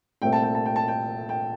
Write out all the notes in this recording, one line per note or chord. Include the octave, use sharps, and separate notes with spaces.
C2 A#2 A3 C4 G5
A5
G5
A5
G5
A5
G5
G5